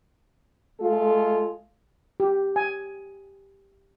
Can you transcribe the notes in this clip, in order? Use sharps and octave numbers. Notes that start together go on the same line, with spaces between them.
G#3 A3 F4 A4
G4
G#5